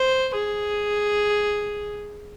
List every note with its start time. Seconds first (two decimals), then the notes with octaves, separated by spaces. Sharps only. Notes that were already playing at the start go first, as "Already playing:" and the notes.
Already playing: C5
0.35 G#4